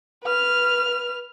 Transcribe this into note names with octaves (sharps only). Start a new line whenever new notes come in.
B4 F6